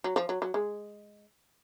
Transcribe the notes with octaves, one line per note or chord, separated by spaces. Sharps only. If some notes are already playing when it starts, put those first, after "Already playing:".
F#3
F3
F#3
F#3
G#3